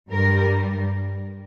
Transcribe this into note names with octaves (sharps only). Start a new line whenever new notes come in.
G2 G3 A#4